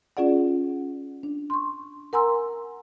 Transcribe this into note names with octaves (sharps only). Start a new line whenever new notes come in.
C#4 F4 G#4 D5 F#5
D4
C6 C#6
A#4 F#5 G#5 A#5 C6 E6